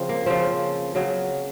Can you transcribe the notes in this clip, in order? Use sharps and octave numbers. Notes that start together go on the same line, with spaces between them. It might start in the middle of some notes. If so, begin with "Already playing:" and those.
Already playing: C#3 F3 C4
A#3
C#3 F3 C4
C#3 F#3